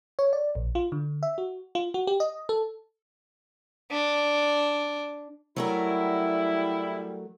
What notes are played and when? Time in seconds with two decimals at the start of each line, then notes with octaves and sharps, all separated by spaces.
0.19 C#5
0.33 D5
0.55 A#1
0.75 F4
0.92 D3
1.23 E5
1.38 F#4
1.75 F4
1.94 F#4
2.07 G4
2.20 D#5
2.49 A4
3.91 D4
5.56 F#3 G3 A3 E4 A#4